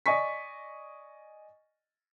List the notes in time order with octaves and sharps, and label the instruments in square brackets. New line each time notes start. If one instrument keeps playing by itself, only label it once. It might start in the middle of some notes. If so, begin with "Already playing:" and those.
[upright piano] D5 D#5 G#5 C#6 B6